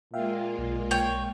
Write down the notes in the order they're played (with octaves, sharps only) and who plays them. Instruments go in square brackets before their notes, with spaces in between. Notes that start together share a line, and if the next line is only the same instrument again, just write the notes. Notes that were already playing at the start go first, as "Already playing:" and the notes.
[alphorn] A#2 [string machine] G#3 A#3 F4 [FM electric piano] E5 F5 G5
[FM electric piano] B1
[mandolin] C#5 G5